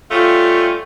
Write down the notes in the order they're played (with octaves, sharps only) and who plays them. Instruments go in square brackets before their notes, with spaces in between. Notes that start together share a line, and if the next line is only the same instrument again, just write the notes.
[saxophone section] G3 A3 C#4 F4